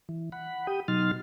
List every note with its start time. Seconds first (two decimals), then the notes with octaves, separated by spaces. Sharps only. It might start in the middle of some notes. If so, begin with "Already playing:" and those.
0.09 E3
0.32 F#5 B5
0.67 G4 G5 D#6
0.88 B2 F#3 D#4 C6 F6 A6